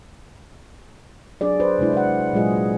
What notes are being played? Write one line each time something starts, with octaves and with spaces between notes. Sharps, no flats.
F#3 C4 D4 G#4 D5
B4 C5
C3 G#3 D4 E4
B4 F#5
A#2 F#3 G#3 F4 G#4 D#5